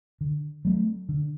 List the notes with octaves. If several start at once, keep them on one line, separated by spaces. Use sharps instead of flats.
D3
F#3 A3 C4
D3